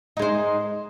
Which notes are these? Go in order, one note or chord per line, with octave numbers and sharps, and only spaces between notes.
G#3 D#4 C5